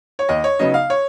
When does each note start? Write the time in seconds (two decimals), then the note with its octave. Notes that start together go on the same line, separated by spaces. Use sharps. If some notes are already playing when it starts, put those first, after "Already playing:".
0.19 C#5
0.29 D#2 D#5
0.44 C#5
0.59 C#3 F#3 B3 D#4 D#5
0.74 F5
0.90 C#5